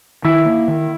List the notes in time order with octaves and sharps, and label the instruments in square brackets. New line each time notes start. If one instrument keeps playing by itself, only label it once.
[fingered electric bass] D#3 [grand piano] E4
[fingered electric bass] A#3
D#3